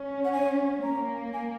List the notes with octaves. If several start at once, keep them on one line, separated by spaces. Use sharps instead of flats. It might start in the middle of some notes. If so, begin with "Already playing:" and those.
Already playing: C#4
F#5
G#5
A#3 A#5
G#5